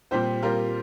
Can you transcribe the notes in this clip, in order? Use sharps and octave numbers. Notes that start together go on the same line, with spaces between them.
A#2 G3 C4 G4 C5
A#2 G3 C4 F4 A#4